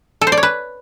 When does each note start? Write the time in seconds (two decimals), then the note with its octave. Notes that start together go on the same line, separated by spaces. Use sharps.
0.21 A4
0.27 C5
0.32 D5
0.37 C#5
0.43 B4